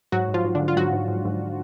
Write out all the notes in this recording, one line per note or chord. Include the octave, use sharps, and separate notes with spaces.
G#2 F#3 F#4
G#2
F3 F4
G#2
D3 D4
G#2
F4
G#2 F#3 F#4
G#2
G#2
G#2